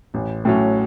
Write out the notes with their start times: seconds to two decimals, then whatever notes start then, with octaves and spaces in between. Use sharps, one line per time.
0.14 A1
0.45 A2 F#3 C#4